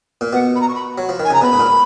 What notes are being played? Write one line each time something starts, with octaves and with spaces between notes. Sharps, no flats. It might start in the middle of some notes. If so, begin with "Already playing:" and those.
A#2
B2 F#5
B5
A#5
C#6
B5
F#3
F3
D#3 G#5
C#3 A#5
B2 B5
G#2
A#2